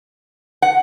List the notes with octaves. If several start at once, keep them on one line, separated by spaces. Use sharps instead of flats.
F#5